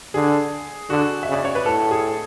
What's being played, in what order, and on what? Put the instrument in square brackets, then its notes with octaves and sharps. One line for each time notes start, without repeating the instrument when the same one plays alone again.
[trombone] D3 [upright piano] G#4
[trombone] D3 [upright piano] F#4
[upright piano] E5
[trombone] C#3
[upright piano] D5
C#5
B4
[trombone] A2 [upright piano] A4
[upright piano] G#4